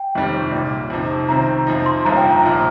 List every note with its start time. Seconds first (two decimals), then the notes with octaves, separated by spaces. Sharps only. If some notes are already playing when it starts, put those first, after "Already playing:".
Already playing: G5
0.15 G1 F2 C3 D#3 G3
0.52 A#1 A#2 G3
0.90 F2 C3 F3 D#4
1.29 C2 C3 D#3 C4 A#5
1.67 F2 F3 D#4
1.86 C6
2.05 G1 G2 F3 A#3 A#5
2.17 G5
2.30 A#5
2.43 A#1 A#2 F3